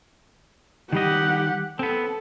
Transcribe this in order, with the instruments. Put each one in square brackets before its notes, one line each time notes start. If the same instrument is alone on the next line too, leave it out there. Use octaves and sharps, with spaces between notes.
[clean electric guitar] D#3 G3 D#5 [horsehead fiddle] G4 F#5
[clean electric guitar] B3 C4 [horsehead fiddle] A4